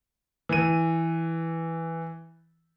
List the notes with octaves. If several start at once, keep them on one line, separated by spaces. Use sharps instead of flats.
E3 D#7